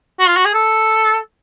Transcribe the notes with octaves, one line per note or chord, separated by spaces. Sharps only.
F#4
F4
F#4
G#4
A4